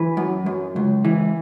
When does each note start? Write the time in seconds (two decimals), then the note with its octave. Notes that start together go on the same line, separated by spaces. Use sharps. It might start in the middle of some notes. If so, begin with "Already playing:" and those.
Already playing: E3 B4
0.17 F#2
0.46 F#2
0.76 C#2
1.05 E3